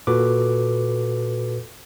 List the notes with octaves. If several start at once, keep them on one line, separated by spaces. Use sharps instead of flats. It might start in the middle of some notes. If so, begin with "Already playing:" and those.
A#2 F#4 A4 B4 D6